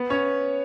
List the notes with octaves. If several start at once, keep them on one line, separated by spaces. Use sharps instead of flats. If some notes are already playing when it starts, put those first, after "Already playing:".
Already playing: B3 B4
C#4 C#5